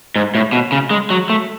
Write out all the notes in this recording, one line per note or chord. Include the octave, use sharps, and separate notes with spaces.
G#2
A2
B2
C#3
G#3
F#3
A3